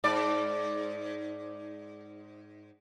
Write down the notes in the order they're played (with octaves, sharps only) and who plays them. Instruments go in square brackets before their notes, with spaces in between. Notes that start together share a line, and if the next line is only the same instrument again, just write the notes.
[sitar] G#2 D5